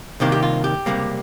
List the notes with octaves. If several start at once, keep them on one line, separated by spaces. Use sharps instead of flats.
C2 C3 D#3 A#3 G4
G4
F4
G4
C#2 C3 G3 A#3